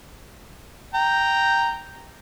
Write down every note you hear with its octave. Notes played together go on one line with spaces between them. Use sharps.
G5 A#5